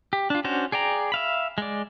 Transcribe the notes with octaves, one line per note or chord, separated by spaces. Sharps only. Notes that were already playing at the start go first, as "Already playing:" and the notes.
G4
D4 F4
C#4 D4 F#4 C5
G#4 D5 G5 A#5
E5 F5 B5
G#3 D5